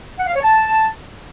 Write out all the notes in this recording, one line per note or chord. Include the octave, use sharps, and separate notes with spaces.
F#5
F5
C#5
A5